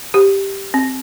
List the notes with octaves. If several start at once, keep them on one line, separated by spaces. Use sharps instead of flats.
G4
C4